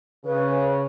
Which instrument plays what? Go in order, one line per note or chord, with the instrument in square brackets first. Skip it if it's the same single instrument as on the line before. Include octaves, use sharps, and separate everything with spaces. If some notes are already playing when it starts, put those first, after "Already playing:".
[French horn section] C#3 [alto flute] B4